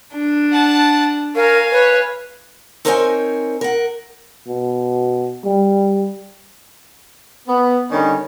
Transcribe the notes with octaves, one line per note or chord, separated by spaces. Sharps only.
D4
F#5 A5
A#4 C#5 F5 G#5
B4 C#5
C4 D#4 A#4 C5 C#5 G#5
A#4 F#5
B2
G3
B3
D3 D#3 G3 C#4 D#4